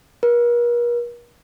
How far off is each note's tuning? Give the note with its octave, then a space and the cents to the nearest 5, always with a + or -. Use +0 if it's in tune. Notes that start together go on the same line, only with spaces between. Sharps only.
A#4 +45